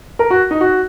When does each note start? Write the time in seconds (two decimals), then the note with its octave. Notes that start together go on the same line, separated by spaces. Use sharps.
0.19 A#4
0.30 F#4
0.51 D#4
0.61 F#4